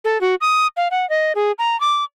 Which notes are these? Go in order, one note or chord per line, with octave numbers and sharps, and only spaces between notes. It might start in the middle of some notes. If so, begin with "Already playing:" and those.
A4
F#4
D#6
F5
F#5
D#5
G#4
A#5
D6